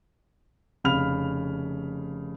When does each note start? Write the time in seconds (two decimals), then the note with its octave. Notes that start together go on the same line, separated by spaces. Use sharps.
0.84 F1 C#3 F5 B5 F6 F7